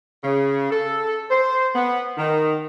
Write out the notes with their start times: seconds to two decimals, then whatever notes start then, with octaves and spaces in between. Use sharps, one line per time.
0.24 C#3
0.71 A4
1.30 C5
1.75 B3
2.18 D#3